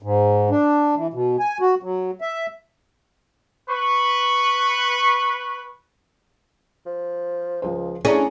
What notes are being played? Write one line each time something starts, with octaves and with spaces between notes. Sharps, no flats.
G#2
D4
E3
B2
G#5
F#4
F#3
E5
B4 C#6
F3
C#2 F3 C5
A3 C#4 D4 E4 G#4 D5 A#5